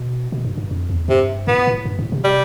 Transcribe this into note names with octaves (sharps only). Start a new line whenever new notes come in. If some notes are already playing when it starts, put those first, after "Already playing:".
Already playing: B2
B2
G2
G2
F2
E2
G2 C3
A2 B3
A2
G2
A2
C3
G3